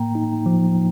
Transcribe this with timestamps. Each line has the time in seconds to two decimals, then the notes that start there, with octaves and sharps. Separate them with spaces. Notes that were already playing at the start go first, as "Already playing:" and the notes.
Already playing: A2 A#3 G5 A#5
0.15 D#4
0.46 F3